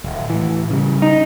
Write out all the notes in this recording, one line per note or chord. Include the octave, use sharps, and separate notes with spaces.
D1
A2 E3
C#3 G3
D#4